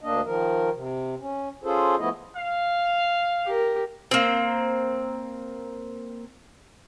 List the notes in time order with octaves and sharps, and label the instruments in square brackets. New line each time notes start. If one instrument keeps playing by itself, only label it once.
[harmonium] D2 A#3 D4 D#5
D#3 F3 A#4
C3
C#4
C#4 F4 G#4 A4 C5
F3 A3 B3 E4 D#5
[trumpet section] F5
[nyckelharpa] G4 A#4
[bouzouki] A#3 C4